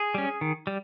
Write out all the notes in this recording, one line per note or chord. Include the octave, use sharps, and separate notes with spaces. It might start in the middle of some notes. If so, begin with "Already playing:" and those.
Already playing: G#4
G3 C#4
D#3
G3